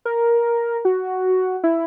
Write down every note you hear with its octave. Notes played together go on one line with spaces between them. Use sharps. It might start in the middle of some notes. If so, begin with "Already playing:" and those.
A#4
F#4
E4